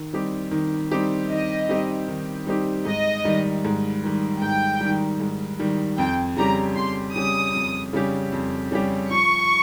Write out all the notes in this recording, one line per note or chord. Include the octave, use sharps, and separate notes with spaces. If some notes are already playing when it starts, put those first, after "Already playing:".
Already playing: D#3
G3 C4 D#4 G4
D#3
G3 C4 D#4 G4
D#3 D#5
G3 C4 D#4 G4
D#3
G3 C4 D#4 G4
G#2 D#5
D#3 G3
G#2
D#3 G3
G#2 G5
D#3 G3
G#2
D#3 G3
F2 G5
C#3 G3 C#4 G4 A#5
F2 C6
C#3 G3 C#4 G4 D#6
F2
C#3 G3 C#4 G4
F2
C#3 G3 C#4 G4
F3 C#6